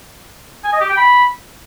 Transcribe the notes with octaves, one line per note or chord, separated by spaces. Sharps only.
G#5
D#5
G4
G5
B5